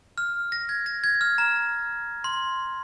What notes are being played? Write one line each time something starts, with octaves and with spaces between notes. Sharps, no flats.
F6
A#6
G#6
A#6
G#6
F6
A#5
C6